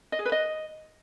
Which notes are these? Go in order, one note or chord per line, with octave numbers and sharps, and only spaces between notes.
D#5
G#4
B4
D#5